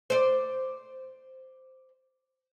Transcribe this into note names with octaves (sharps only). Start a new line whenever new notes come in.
C5 D5